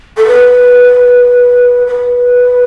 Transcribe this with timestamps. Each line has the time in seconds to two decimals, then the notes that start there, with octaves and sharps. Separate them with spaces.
0.17 A4
0.27 B4
1.87 B4